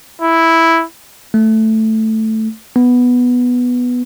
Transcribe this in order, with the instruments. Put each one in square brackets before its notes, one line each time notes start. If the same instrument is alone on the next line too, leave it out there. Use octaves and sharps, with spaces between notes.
[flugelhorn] E4
[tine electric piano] A3
B3